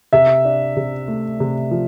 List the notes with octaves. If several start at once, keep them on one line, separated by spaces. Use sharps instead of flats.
C3 E5
D4
C3
A3
C3
F3